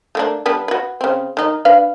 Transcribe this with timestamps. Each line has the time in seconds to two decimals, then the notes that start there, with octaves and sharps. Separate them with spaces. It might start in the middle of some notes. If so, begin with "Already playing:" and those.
0.15 A3 A#3 D4
0.46 G3 B3 D4
0.68 F#4 B4
1.01 C#3 C4
1.37 D#3 D#4
1.65 D4 B4 F5